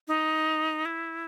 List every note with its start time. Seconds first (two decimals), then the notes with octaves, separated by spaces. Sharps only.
0.08 D#4
0.85 E4